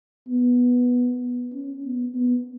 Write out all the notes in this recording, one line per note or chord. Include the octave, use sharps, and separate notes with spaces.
B3
C#4
B3
B3